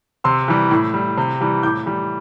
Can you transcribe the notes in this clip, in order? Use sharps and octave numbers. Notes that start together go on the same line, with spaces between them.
C3 C6 E6
E3 G3
A2
G3
C3
E3 G3
A2 D6 G6
E3 G3